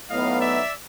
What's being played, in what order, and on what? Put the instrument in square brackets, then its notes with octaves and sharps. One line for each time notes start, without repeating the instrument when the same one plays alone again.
[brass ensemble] A2 F#3 B3 D#4 [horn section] D#5 F5
[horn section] D5 E5